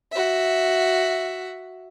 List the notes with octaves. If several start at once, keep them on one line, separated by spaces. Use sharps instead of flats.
F#4 E5